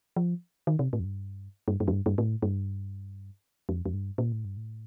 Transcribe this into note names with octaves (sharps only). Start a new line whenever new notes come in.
F3
D#3
C3
A2
F2
G2
G2
G2
F2
G2
G2
A2
G2
F2
F2
G2
A#2
A2
G2
A2